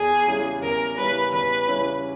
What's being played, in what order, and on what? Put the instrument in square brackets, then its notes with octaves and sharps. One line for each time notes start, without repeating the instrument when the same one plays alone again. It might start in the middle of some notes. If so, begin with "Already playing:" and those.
Already playing: [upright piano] E2 [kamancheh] G#4
[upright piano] C#3 G3 C#4 E4
[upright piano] E2 [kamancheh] A#4
[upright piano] C#3 G3 C#4 E4 [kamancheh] B4
[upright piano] E2 [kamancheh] B4
[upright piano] C#3 G3 C#4 E4